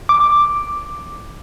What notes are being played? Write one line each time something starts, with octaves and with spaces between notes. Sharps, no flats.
D6